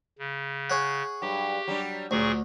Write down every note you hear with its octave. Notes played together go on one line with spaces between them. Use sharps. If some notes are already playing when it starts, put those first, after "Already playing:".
C#3
G#4 C#5 F#5
G2 F#3 G4
F#3 G3 D4
D2 A#2 F#3 G#4 C#6